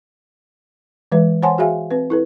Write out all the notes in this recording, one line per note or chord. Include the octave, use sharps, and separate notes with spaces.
E3 G#3 B4 E5
C5 C#5 F#5 G#5 A5 C6
F#4 G#4 E5 F5 G#5
C4 B4
E4 A4 B4